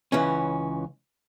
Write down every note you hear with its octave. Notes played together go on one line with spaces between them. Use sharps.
C#2 E3 C#4